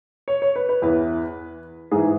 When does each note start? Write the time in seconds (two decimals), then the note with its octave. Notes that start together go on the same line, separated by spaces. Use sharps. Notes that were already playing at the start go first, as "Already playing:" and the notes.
0.28 C#5
0.42 C#5
0.56 B4
0.69 B4
0.82 E2 E3 B4
1.91 G#2 E3 G#4